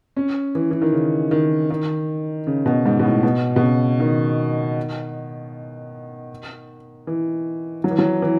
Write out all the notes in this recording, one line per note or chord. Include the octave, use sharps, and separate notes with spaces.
C#4
E3
E3
D#3
C#3
D#3
D#3
C#3
B2
G#2
B2
A2
B2
B2
C#3
D#3
E3
F#3
E3
F#3
E3